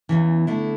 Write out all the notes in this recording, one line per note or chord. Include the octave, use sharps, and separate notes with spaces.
E2 C#3 E3
D3 A3 E4